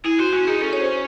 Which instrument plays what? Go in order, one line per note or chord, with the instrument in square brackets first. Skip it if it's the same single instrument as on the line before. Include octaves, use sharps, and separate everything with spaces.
[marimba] E4 [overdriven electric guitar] G#4
[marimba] F#4 [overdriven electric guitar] C5
[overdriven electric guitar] C#4 [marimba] F#4
[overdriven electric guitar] D#4 [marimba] G#4
[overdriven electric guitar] C#4 [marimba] A4
[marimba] C#5
C5